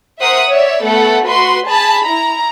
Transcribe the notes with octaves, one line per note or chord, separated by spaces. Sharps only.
A#4 C5 E5 F#5 D#6
C#5 D5 E5
A3 B3 A4 F#5
F#4 B4 C6
G#4 A5 B5
E4 A#5